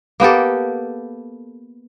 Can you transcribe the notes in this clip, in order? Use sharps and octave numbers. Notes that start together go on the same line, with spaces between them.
A#3 B3 G4 A4